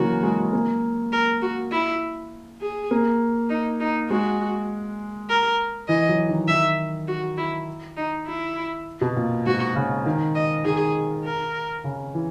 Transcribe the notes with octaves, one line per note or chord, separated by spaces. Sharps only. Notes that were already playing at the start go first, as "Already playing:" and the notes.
Already playing: C#3 E3 F#3 A#3 F#4
G#3
A#3
A#4
F#4
E4
G#4
A#3
D#4
D#4
G#3 F#4
A#4
E3 D#5
F#3
D#3
D#3 E5
F#4
E4
D#4
E4
B2
A#2
G#2 F#4
C#3
D#3
D#5
D#3 G#4
A#4
C#3
E3